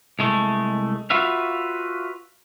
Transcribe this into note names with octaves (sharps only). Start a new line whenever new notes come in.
C2 G#3 A3
F4 F#4 B4 E5 F5